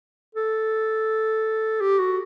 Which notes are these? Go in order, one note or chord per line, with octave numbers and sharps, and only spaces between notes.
A4
G4
F#4